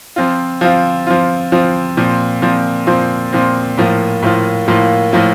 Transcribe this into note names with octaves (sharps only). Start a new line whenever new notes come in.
F3 C4 F4
F3 C4 F4
F3 C4 F4
F3 C4 F4
A#2 F3 C4
A#2 F3 C4
A#2 F3 C4
A#2 F3 C4
A2 F3 A#3 F4
A2 F3 A#3 F4
A2 F3 A#3 F4
A2 F3 A#3 F4